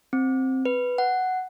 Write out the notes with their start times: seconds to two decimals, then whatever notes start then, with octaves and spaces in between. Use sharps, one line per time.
0.13 C4
0.65 B4
0.98 F#5